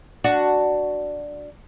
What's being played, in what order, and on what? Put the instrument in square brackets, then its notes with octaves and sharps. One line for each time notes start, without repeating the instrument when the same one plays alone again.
[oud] D4 F#4